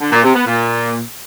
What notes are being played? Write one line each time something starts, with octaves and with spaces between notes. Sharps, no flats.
D3
A#2
C3
B3
A#2